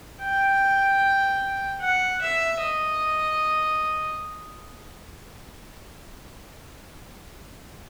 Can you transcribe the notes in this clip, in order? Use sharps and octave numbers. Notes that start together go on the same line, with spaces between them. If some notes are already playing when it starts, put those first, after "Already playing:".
G5
F#5
E5
D#5